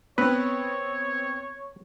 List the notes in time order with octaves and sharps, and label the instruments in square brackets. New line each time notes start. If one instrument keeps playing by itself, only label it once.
[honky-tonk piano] B3 C4 [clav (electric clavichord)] B4 [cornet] C#5